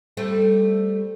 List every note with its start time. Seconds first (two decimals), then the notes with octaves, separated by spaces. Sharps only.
0.17 G3 A3 C4